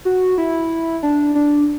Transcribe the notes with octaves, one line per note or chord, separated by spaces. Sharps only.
F#4
E4
D4
D4